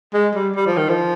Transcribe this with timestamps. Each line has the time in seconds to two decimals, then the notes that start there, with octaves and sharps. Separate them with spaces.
0.14 G#3
0.35 G3
0.56 G3
0.67 F3
0.77 D#3
0.89 F3